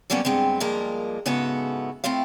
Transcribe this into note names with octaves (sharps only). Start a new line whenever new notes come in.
D3 F#3 G3 A#3 B3 C#4
G2 G#3 B3 C4
G2 F3 G#3 A#3 A#4
G#2 C#3 B3 E4 F#4 A4
A3 C4 E4 F4 F5